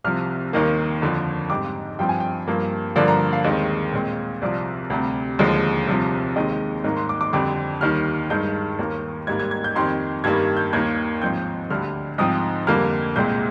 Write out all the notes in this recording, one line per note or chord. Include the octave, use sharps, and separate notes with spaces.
C2 C3 F3 F6
D#2 D#3 A#3
F2 D3 F3
G#2 G3 C4 D6
G2 F3 C4 G5
G#5
G5
G2 F3 A#3
G2 D3 F3 A#3 D5
A#5
F5
D#2 D#3 G#3 C4
A#2 G#3 C4
C2 C3 F3 D5
D2 C3 G3
D#2 D3 F3 G#3
C2 C3 F3
D#2 D#3 G#3 C4 D#5
G#2 D#3 A#3 A#5
C6
D6
D6
F2 D3 G3 C4 D6
D#2 D#3 G3 F6
G2 D#3 G#3 G6
D#2 D#3 A#3
G#2 G3 A#3 G#6
G#6
G#6
G6
F2 D#3 G3 C4 C6
G2 D#3 G3 A#3 G#6
G6
D#2 D#3 A#3 G#6
G#2 F3 C4 G6
D2 D3 G3 F6
G#2 F3 C4 D#6
F2 D3 G3 A#3 F6
C2 A#2 G#3 C4 G6